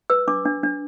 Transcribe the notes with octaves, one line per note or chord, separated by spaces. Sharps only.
B4 E6
D4 D6
D4
D4